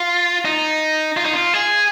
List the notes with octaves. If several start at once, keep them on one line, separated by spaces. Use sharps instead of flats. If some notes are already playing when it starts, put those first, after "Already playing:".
Already playing: F4
D#4
F4
D#4
F4
G#4